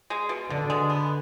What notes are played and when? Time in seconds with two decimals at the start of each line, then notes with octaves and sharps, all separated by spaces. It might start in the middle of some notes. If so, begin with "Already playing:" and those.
0.10 G#3
0.29 B2
0.50 B2 D3
0.70 G#3
0.90 B3